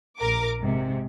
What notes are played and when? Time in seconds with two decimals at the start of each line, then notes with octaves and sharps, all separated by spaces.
0.19 A#1 A#4 D6
0.60 G#2 C3